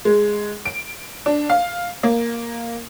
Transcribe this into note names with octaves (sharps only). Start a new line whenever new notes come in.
G#3
D7
D4
F5
A#3